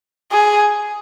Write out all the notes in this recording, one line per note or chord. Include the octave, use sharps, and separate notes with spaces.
G#4